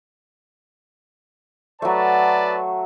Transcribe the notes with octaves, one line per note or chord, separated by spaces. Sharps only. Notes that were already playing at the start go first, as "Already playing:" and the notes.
F#3 A3 B4 D5 A5